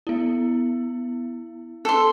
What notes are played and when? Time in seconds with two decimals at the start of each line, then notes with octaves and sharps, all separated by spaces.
0.07 B3 E4
1.85 A4 C6